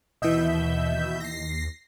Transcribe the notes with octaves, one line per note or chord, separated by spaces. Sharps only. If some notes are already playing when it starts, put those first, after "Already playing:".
D#2 B2 E3 D#5 E5 G6
A#6 C7